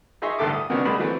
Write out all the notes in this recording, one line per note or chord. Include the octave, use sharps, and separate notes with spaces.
D#4 G#4 D#5 E5 C6 C#6
A1 D2 G2 A4 E5 D6
D#6
C3 D#3 F#3 B3 C#4 D4
A#1 G#3 A#3 D5 B5 D#6
E3 F#3 A3 C4